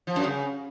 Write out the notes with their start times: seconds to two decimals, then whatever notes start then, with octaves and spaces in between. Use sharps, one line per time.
0.07 F3
0.16 F#2
0.25 C#3